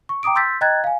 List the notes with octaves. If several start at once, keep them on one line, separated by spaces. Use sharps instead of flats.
C#6
G5 A#5 D6 D#6 D7
C6 E6 G6 A6 B6
D#5 G5 A#5 F#6 G#6 A6
F5 G#5